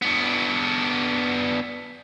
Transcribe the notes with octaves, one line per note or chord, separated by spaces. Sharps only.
B3 D4